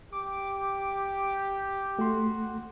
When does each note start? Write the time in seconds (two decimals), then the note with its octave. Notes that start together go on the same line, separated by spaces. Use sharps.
0.13 G4 D6
1.99 A3 F#4 C6